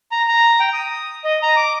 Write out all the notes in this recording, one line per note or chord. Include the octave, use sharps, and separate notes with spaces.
A#5
A#5
G5
D#6
D#5
A#5
D6